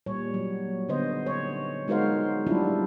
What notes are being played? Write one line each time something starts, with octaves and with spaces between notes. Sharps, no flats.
A#2 G3 C#5
F#3
D3 B3 C5 D#5
C#5
G#3 D#4 F#4 A#4 C5 F5
F#3 G3 D4 E4 F4